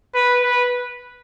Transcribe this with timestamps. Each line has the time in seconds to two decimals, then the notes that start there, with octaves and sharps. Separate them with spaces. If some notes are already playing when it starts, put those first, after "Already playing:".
0.14 B4
0.43 B4